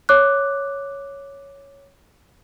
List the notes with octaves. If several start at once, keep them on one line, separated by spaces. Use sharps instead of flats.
C#5 D6 F#6